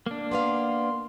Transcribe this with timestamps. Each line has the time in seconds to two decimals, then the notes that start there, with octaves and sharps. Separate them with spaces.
0.06 A#3 D4
0.31 B3 B4 F5 C6